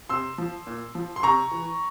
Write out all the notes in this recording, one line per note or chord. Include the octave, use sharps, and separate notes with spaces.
C3 C6 E6
F3
A#2
F3
C6
C3 A#5 C#6
E3